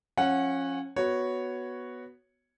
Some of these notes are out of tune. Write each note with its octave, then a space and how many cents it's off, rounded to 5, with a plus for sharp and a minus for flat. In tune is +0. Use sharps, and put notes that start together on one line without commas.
F3 +20 C#4 -20 F#5 +0
B3 +0 F#4 +0 C#5 +0